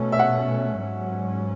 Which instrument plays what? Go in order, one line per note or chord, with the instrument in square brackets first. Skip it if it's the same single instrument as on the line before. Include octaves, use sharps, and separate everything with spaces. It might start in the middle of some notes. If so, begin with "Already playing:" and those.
Already playing: [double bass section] B2 A3 C#4
[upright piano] E5
F#5
[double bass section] G#2 F#3 C#4